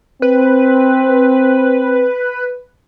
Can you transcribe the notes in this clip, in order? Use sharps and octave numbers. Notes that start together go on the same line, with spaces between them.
C4 B4